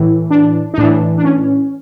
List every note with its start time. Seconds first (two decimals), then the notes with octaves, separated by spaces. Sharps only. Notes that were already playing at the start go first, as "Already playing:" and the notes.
Already playing: A2 E3
0.31 D4
0.74 D#4
0.78 A2 E3 D4
1.18 D4
1.24 C#4